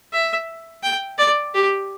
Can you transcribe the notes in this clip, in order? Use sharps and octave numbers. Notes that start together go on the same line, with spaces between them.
E5
G5
D5
G4